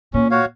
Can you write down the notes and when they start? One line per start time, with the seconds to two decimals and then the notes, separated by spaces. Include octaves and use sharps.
0.14 A#2 C#4
0.31 F#4 C#5 F5